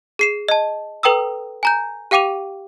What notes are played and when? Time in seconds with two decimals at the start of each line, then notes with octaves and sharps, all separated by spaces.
0.19 G#4 C7 E7
0.48 D#5 A5
1.03 A4 B4 G5 A#5 D#6 E6
1.63 G#5 A#5 G6
2.11 G4 F5 G5 D6 D#7 F7